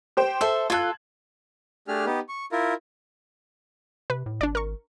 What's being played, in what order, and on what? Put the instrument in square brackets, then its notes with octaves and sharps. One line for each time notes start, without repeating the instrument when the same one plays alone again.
[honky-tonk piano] G4 C5 G5
[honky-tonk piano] A4 [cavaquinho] C5 E5
[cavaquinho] F4 A4 [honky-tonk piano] F#6 G#6
[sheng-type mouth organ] A3 D4 G4 G#4 F6
B3 D#4 G4
C#6
E4 F4 A#4
[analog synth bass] C3 [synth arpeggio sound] B4
[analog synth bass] A2
[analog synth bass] G#1 [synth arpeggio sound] D4 D5
[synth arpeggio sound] A#4 C#6